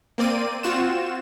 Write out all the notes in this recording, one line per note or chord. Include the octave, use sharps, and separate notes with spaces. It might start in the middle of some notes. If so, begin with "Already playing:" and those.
A#3 C4 D5 D#7
C4 F4 F#4 E7